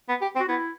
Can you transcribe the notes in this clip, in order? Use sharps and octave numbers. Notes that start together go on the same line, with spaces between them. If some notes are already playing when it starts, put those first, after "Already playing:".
B3
G4
C4
F#4
B3 E4